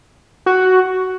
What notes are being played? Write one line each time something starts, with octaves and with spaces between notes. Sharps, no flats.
F#4